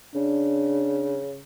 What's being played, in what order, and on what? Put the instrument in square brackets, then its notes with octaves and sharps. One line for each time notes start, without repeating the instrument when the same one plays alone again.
[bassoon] C#3 [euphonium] D4